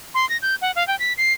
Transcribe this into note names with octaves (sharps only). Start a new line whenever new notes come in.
C6
A#6
G6
F#5
F5
G5
B6
C7